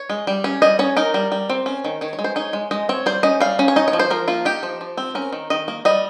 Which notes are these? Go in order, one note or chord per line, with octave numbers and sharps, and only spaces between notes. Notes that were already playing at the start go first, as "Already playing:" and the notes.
Already playing: C#5
G#3
G3
C#4
G3 D#5
C#4 C#5
D#4 A#4
G3
G3
C4
C#4
D#3
D#3 C#5
C#5
G#3
C5
D#4 C#5
G#3
G#3 D#5
C4 C#5
G3 C5
C#4 D#5
G3 F5
C#4
C#5
D#4 D#5
C#5
F3
C5
F3 A#4
A#3 F4
D#4 G4
F3
F3
C4
C#4 A#4
D#3
D#3 D#5
A#3
G3 D#5